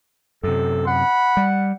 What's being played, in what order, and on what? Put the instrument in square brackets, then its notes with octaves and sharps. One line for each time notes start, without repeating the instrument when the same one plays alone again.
[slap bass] F#2 C3 [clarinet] A4
[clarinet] F#5 [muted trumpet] B5
[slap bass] G3